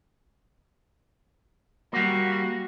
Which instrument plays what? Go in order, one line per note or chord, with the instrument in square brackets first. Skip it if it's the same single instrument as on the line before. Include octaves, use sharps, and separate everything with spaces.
[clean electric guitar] G3 A#3 [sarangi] F#4